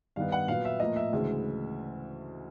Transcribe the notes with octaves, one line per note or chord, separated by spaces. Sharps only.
G2 D#3 G3 B3 F5
F#5
A#2 F#3 B3 F5
E5
A2 F3 A#3 D#5
E5
D2 C#3 E3 G#3